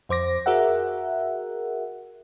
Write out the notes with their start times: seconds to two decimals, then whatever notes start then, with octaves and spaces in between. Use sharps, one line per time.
0.09 F2 C5 D6 A#6
0.46 F#4 G#4 A#4 E5 F#5